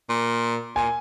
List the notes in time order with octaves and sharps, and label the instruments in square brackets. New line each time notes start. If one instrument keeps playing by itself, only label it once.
[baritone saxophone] A#2
[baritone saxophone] A#2 [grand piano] G#5